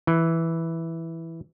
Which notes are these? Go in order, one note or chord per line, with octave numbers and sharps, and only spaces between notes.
E3